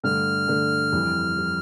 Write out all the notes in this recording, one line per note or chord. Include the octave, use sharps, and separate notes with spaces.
G2 D3 A3 F6
G2 D3 A3
F2 E3 G3
E3 G3